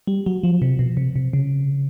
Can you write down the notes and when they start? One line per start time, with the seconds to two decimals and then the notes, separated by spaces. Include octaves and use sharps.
0.07 G3
0.26 F#3
0.43 F3
0.62 C3
0.79 B2
0.97 C3
1.16 C3
1.33 C#3